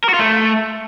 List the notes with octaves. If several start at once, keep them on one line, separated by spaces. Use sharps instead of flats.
A#4
F#4
F4
A3